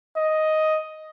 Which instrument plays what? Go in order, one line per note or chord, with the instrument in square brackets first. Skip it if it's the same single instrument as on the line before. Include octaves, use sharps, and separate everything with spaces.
[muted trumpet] D#5